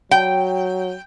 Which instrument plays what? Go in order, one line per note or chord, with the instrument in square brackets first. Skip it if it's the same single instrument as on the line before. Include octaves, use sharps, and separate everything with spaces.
[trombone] F#3 [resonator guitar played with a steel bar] G5